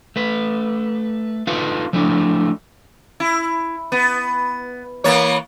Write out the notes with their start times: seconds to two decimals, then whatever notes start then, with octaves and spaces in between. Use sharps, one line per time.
0.16 A3 B4
1.47 D#4 F4 A4 B4 F5
1.93 F3 A3 D4 E4
3.20 E4
3.92 B3
5.04 E3 A#3 C#5